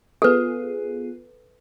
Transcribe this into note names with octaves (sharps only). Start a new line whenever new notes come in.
B3 F4 G#4 A4 B4